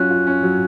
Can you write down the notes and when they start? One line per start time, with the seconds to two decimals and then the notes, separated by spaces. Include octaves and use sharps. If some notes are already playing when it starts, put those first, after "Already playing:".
Already playing: F#3 C#4 F4 F#6
0.10 F4
0.27 C#4
0.43 F#3